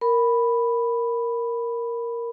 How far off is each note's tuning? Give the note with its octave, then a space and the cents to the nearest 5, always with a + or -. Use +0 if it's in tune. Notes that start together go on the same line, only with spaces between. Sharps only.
A#4 +0 B5 +0